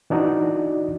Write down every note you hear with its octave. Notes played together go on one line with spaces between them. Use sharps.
E3 D4 D#4 F#4 D5